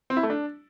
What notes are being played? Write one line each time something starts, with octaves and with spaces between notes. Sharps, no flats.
C4
E4
A3
D4